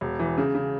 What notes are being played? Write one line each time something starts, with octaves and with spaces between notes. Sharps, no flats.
E1
E3
C#3
C#3